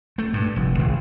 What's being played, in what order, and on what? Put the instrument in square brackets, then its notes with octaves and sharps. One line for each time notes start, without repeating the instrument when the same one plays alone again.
[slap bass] A3
G2
F1
G#1